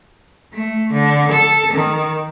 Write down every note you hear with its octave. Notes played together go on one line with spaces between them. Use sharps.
A3
D3
A4
D#3